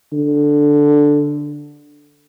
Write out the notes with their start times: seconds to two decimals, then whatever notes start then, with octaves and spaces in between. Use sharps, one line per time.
0.13 D3